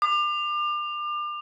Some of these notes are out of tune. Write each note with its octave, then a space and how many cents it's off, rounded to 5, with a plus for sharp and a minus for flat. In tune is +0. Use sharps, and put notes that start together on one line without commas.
D6 +35